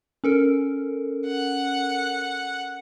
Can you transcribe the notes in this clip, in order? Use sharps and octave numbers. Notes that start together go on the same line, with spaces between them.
C#4 A4 A#4
F#5